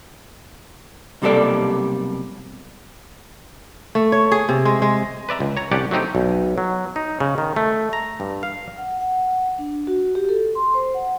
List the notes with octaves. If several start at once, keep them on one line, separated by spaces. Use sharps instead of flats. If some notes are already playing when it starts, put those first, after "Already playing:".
B1 C3 G3 A#3 A4 D5
A3
C#5
G#4
C3
G#3
G#3
B4 D5 E5 A#5
C#2
C#5 A#5
C2 C#4 D4 G4 D5 F#5
F#3 A3 C4 D#4 G4
B1
F#3
D#4
C#3
D#3
A3
A#5
G2
F5
F#5
F#5
D4
F#4
G4
A4
C6
C5
F#5